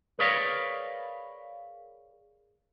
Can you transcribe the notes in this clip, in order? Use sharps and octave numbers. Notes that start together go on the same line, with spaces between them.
G#4 A#4 B4 C#5 D5 F5